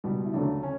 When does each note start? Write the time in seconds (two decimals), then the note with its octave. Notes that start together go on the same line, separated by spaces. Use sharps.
0.04 C#2 B2 G3
0.25 E4
0.34 D2 C#3 F#3 A3 D4
0.63 C#4